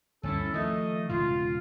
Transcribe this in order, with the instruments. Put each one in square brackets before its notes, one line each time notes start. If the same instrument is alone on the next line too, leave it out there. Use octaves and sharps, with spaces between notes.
[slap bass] D2 G2 E3 [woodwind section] C#4 E4 A4
[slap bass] D#3 F3 [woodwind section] A3 D#5
[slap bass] E1 G#2 C#3 [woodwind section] F4